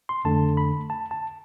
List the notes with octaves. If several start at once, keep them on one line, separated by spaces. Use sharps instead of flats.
C6
F2 D3 A3 A5
B5
A5
A5